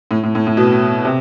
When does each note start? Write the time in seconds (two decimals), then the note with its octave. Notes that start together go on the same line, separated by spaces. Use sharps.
0.11 A2
0.23 A2
0.35 A2
0.47 A2
0.57 B2
1.05 C3